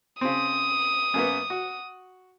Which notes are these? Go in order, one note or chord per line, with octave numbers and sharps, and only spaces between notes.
C#3 C4 D#6
F#2 A#3 B3
F#4